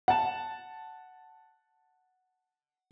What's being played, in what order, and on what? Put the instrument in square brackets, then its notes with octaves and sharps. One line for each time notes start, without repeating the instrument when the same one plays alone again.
[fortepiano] F#5 A5